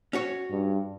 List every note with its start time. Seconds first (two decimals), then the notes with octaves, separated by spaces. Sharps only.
0.13 C#4 F#4 C#5
0.50 G2